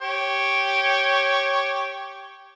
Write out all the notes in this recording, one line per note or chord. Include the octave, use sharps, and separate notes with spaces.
G4 C#5